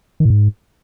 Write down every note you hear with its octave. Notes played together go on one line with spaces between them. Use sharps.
D#3
A2
G#2